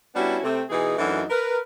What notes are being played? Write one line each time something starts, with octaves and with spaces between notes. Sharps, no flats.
G3 B3 C#4 D4 E4 F#4
C3 A3 C4
B2 E3 D#4 G#4
F#2 E3 F#3 A3 D4 D#4
A#4 B4